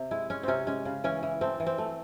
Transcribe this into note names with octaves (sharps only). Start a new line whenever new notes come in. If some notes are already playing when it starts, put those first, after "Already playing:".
Already playing: C3
G#3 E4
G#3 C#4
C3 C4 C#4
G#3 C#4
C#3
E3 C#4
E3
A3 C4
E3
C4
A3